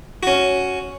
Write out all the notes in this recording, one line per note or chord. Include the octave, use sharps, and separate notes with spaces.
C#4 F#4